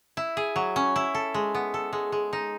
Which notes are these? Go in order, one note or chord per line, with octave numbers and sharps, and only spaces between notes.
E4
G#4
F#3
C#4
E4
A4
G#3
B3
A4
G#3
G#3
D#4